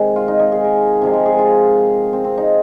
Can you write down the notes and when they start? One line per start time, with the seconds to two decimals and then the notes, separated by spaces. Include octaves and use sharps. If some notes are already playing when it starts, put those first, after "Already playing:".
Already playing: C3 D#3 G#3
0.16 F4
0.28 D#4
0.39 D#4
0.52 G#4
0.64 A#4
1.02 C3 F3 G#3
1.13 A#4
1.26 G#4
1.38 F4
2.13 C4
2.24 C4
2.37 D#4